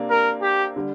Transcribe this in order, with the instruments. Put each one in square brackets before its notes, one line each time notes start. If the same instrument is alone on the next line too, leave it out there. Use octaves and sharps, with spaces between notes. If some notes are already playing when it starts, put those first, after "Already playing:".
Already playing: [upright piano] C3 A#3 D4
[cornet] A#4
G4
[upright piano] D3 G3